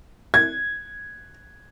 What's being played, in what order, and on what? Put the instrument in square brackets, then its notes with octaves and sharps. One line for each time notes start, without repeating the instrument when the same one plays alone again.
[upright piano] G#6